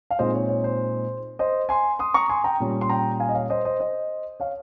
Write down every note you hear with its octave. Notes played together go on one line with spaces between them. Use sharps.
F5
A#2 G#3 C4 D#4 C5 D#5
C#5
C#5
C5
C5 D#5
G#5 C6
C6 D#6
A#5 C#6
G#5 C6
G5 A#5
A#2 G3 C#4
C6
G5 A#5
F5 G#5
D#5
C#5 F5
C5 D#5
C5 D#5
C5 D#5
C#5 F5